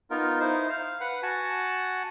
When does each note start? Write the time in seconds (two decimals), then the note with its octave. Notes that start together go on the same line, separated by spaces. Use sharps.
0.11 B3 D#4 F4 A#4
0.40 D#4 E4 C5
0.69 F5
1.01 B4 F#5
1.23 F#4 F#5 G#5 A5